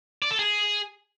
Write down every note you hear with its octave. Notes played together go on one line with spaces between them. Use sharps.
D5
A4
G#4